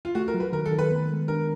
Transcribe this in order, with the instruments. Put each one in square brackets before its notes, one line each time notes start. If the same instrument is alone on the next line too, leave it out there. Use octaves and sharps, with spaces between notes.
[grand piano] F4
[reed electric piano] A3 [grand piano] F#4
[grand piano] A#4
[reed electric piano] F#3
[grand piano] B4
[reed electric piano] D#3 [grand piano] A#4
[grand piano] A4
[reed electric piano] D#3
[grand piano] B4
[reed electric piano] B3
G#3
[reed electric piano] D4 [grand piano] A#4